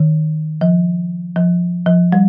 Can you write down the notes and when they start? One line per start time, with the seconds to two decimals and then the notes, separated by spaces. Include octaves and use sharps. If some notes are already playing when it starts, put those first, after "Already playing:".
Already playing: D#3
0.61 F3
1.36 F3
1.86 F3
2.12 G3